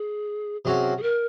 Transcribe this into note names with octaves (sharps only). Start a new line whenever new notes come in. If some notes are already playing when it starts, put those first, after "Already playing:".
Already playing: G#4
C3 F#3 C#4 F#4 G#4
G#4
A#4